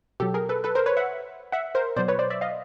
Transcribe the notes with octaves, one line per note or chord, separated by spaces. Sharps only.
B2 F#3 G4 A4
G#4 A#4
A4 B4
A4 B4
A#4 C5
B4 C#5
E5 F#5
E5 F#5
A#4 C5
B2 F#3 C5 D5
B4 C#5
C5 D5
D5 E5
D#5 F5